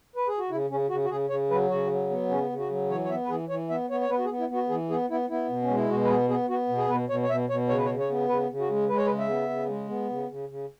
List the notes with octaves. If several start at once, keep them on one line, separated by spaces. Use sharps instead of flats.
B4
G#4
F#4
C#3 E4
C#3 C#4
C#3 F#4
F#4
C#3 G#4
C#3 C#5
F#3 B4
C#3 F#4
F#3
B3
C#3 C#4
C#3
F#4
F#3
E3 C#5
C#5
B3 E5
B4
E3 G#4
E3 C#5
B3 E5
B3 C#5
C#5
B3 B4
F#4
G#4
B3
E4
B3 F#4
E3 G#4
B3 G#4
B3 E4
B3 E4
B2
C#4
G#3
E4
B2 F#4
B4
B3 G#4
B3 G#4
B3 F#4
B2
G#4
B2 B4
B2 C#5
C#5
B2 E5
B2 C#5
C#3 C#5
B4
C#5
C#3
C#5
B3
C#3 B4
C#3
F#4
G#3
G#3 B4
C#5
B4
C#3
E5
B3
C#3
G#3
B3
C#3
C#3
C#3